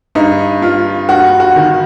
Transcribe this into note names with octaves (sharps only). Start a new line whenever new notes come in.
G2 D#4
G2 F4
G2 F#4
F#4
D#3